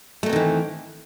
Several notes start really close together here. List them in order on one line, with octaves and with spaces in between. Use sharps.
A3 F#3 C4 D#3 E3